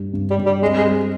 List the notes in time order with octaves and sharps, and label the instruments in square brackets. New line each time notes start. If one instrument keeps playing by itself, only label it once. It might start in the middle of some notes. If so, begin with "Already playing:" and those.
Already playing: [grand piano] G2 G3
G2
[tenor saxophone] G3
[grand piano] G2
[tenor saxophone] G3
[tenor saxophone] G#3 [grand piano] C4
[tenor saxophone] G#3
[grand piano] G3